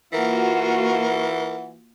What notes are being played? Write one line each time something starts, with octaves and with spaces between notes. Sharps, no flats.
E3 A#3 F4 F#4 A#4 F#5